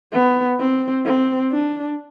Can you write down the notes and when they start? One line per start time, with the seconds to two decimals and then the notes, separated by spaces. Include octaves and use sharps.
0.12 B3
0.59 C4
1.05 C4
1.52 D4